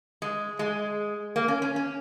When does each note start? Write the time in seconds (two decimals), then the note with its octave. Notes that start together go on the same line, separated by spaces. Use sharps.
0.22 G#3
0.59 G#3
1.36 A#3
1.48 C#4
1.62 C#4
1.76 C#4